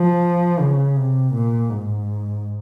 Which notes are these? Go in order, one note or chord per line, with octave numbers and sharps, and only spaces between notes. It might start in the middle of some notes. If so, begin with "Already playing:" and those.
Already playing: F3
C#3
C3
A#2
G#2